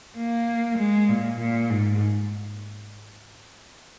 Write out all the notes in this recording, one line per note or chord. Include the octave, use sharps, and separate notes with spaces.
A#3
G#3
A#2
A#2
G#2